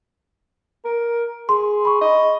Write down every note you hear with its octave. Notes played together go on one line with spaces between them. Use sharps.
A#4
G#4 C6
B5 C#6
D#5